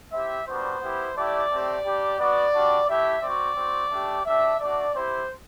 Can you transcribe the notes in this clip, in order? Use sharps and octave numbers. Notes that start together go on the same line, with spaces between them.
C4 E4 G4 E5
G3 B3 D4 F#4 C5
B3 E4 G4
A3 E4 G4 D5
A3 C4 G4
G3 D4 G4
B3 F#4 D5
G3 D4 F#4
A3 E4 G4 E5
C4 F#4 D5
C4 F#4
A3 D4 G4
A3 D4 G4 E5
A3 D4 F#4 D5
C4 E4 G4 C5